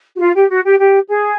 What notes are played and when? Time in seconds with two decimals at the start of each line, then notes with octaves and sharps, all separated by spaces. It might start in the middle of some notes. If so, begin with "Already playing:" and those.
0.16 F#4
0.20 F4
0.35 G4
0.50 F#4
0.65 G4
0.78 G4
1.08 G#4